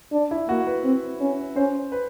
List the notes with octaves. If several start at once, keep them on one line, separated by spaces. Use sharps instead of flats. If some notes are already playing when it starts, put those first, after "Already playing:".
D4
E4
A#3 F#4
B4
C4
C#4
C#4 C5
B4